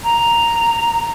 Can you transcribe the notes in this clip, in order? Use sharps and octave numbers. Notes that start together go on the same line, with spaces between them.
A#5